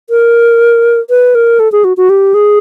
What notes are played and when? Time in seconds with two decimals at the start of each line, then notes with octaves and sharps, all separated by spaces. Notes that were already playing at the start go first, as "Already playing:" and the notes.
0.10 A#4
1.10 B4
1.35 A#4
1.60 A4
1.72 G#4
1.84 F#4
1.97 F#4
2.10 G4
2.34 G#4